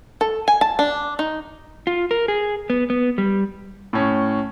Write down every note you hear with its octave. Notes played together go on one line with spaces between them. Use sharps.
A4
G#5
A5
D4
D#4
F4
A#4
G#4
B3
B3
G3
A2 C#4